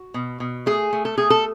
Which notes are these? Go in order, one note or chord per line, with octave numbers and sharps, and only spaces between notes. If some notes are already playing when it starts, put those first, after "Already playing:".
Already playing: F#4
B2
B2
A3 G#4
A3
A4
A3 G#4
A4